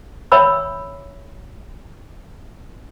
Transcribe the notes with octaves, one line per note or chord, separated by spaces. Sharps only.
C#5 E5 G5 B5 E6